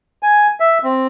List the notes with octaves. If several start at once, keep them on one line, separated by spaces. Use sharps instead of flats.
G#5
E5
C4